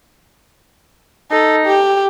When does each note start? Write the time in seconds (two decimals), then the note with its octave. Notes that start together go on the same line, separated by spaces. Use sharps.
1.31 D#4 A4
1.66 G4